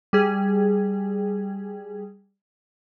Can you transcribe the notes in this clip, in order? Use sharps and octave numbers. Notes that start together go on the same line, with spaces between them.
G3 G#4